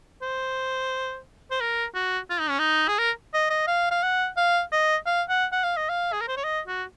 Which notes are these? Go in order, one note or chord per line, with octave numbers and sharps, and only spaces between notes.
C5
C5
A#4
F#4
F4
D#4
C#4
D#4
G#4
A#4
D#5
D#5
F5
F5
F#5
F5
D#5
F5
F#5
F#5
F5
D#5
F5
G#4
A#4
C5
C#5
D#5
F#4